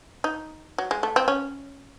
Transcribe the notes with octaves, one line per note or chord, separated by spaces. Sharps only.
D#4
F#3
G#3
A3
C4
C#4